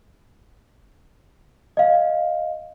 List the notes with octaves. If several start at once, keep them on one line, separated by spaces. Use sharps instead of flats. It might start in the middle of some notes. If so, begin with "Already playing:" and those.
D#5 F5